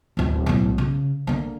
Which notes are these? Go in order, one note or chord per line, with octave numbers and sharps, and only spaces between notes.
D1 G#1
B1 A2
C#3
D3 A#3